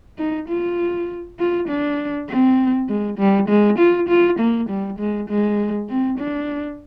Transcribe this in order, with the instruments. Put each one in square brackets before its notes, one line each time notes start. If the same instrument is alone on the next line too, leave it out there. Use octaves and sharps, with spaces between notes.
[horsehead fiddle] D#4
F4
F4
D4
C4
G#3
G3
G#3
F4
F4
A#3
G3
G#3
G#3
C4
D4